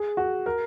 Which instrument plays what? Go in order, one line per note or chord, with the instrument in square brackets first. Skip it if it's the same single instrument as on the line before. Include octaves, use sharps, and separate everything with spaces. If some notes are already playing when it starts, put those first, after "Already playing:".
Already playing: [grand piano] G#4
F#4
A#4